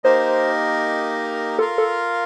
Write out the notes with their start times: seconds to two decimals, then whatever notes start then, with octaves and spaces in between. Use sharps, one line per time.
0.04 A#3 D#4 G4 A#4 C5 D#5
1.59 F4 A4 A#4 F5
1.78 A4